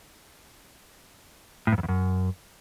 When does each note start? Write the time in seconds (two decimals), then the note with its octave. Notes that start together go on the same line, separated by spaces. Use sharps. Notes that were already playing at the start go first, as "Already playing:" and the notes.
1.67 A2
1.73 G2
1.78 F2
1.83 E2
1.89 F#2